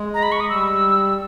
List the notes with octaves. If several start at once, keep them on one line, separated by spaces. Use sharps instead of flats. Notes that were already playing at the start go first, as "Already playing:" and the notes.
Already playing: G#3
A#5
B5
C#6
D#6
G3 E6